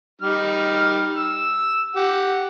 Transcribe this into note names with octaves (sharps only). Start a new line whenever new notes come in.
G3 D#4 F6
E6
G4 F#5